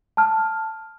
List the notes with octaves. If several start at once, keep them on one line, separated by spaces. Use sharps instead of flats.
A5 F6